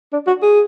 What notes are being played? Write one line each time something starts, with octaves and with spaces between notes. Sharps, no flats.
D4
F#4
G#4